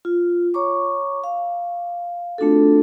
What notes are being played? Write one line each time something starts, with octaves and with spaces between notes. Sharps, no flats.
F4
C#5 A#5 C#6 D6
F5
A3 C4 D4 F4 F#4 A4